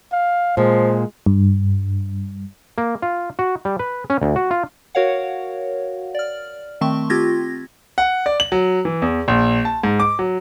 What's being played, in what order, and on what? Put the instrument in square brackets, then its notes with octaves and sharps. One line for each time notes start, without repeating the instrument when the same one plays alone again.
[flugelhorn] F5
[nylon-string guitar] A#2 [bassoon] F3 [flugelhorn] G#3
[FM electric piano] G2
[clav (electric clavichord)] A#3
F4
F#4
G3
B4
C#4
D2
F#4
F4
[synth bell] F#4 A#4 C#5 F5 F#5
D5 F6
D#3 A3 C4 A5 C6 C#6
C4 F4 G4 G#6 A#6
[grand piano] F#5
D5
F#7
F#3
E3
E2
A#1
A5
G#2
D6
F#3